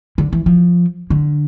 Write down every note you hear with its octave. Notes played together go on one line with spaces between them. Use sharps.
D3
E3
F3
D3